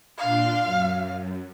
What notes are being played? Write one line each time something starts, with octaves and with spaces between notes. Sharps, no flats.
A#2 D4 F5 C6
F#2